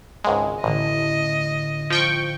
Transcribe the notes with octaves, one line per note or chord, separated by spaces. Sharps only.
G#1 C#2 G#3
A1 A2 D3 D#5
F3 G5 C#6